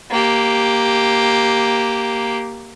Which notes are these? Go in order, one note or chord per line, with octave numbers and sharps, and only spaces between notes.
A#3 G4